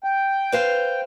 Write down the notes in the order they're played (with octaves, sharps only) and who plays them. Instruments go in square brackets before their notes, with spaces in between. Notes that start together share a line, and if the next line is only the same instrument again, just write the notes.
[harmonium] G5
[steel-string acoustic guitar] B4 C5 F5